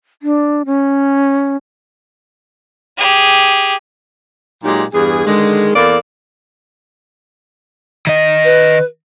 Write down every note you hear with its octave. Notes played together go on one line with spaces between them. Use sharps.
D4
C#4
G4 G#4
A#2 F#3 G#3 D#4 G4
E2 G2 G#4
D3 D#3 G#3
E2 A#3 A4 D5
D#3 D#5
B4